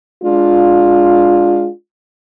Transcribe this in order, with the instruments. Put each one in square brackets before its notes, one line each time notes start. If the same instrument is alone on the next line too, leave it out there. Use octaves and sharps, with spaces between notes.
[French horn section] G#3 D4 F4